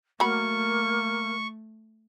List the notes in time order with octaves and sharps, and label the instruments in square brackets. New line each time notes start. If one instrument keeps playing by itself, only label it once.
[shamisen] F#3 B5 [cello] A3 [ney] A#3 [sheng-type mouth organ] C#6